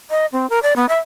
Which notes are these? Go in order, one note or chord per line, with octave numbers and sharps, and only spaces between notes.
D#5
C4
A#4
D5
B3
E5